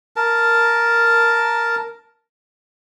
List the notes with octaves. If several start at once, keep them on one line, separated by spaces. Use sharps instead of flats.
A#4 A5